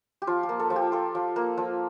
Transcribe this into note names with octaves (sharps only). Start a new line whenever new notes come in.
G4
F3 F4
G4
A#3
A4
F3
G4
F4 A4
F3
A#3
F3